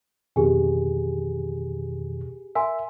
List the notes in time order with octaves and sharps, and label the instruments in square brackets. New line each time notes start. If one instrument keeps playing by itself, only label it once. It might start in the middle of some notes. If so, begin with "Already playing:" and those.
[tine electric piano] F2 B2 D#3 [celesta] G4 G#4 G#5
[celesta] A#4 G#5 C6 [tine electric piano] E5